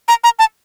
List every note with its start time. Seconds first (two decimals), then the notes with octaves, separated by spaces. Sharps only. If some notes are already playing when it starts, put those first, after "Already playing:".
0.08 A#5
0.24 A#5
0.39 A5